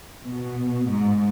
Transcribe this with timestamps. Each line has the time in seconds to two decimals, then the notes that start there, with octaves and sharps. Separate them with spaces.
0.24 B2
0.88 G#2